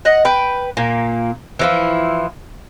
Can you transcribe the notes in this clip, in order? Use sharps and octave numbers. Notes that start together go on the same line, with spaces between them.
D#5 F#5
B4 G5
A#2 A#3
E3 F3 E4